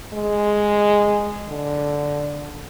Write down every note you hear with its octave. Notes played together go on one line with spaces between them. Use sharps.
G#3
D3